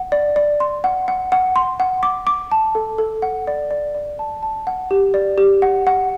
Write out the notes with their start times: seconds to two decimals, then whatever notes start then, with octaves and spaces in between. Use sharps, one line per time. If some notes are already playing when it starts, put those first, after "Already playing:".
Already playing: F#5
0.12 D5
0.36 D5
0.60 C6
0.84 F#5
1.08 F#5
1.32 F#5
1.56 C6
1.80 F#5
2.03 D6
2.27 D6
2.52 A5
2.75 A4
2.98 A4
3.22 F#5
3.47 D5
3.71 D5
3.95 D5
4.19 A5
4.43 A5
4.67 F#5
4.91 G4
5.14 D5
5.38 G4
5.62 F#5
5.87 F#5